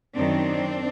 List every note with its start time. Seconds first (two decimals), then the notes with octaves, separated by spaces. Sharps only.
0.15 F#2 D#3 F#3 C4 D4